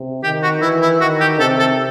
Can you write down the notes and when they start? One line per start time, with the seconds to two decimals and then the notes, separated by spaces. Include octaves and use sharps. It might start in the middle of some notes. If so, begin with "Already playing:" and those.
Already playing: C3
0.23 D#3 G4
0.43 F#4
0.62 E3 E4
0.82 E4
1.01 D#3 F#4
1.20 G4
1.39 C3 A4
1.59 A4